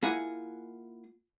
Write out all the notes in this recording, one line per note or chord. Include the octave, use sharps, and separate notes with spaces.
A#3 E4 F4 G#4 F#5 G#5